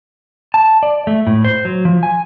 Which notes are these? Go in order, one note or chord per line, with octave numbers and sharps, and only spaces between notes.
A5
D5
A3
A2
C5
F#3
F3
G#5